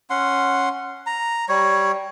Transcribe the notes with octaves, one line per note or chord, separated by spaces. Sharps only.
C#4 F#5 C6
A#5
G3 C#5